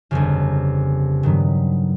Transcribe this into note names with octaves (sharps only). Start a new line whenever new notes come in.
G1 F2 C#3
G2 D#3 F#3 B3